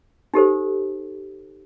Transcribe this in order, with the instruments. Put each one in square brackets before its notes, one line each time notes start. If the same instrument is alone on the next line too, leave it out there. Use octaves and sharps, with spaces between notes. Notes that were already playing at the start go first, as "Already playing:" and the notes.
[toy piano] D#4 G4 A4 C5